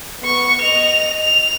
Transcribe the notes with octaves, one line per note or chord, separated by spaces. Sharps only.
B3 C#6
D#5 F7
F7